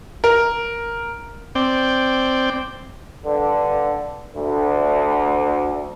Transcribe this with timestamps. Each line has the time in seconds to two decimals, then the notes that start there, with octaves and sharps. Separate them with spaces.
0.24 A#4
1.55 C4 D5 G5
3.24 G2 D3
4.35 D2